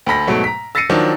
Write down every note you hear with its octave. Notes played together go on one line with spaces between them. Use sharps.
D2 A4 B5 A#6
G#2 B2 F#3 A3
A#5 B6
E6 A6 A#6 C7 C#7 D#7
D#3 F3 F#3 D4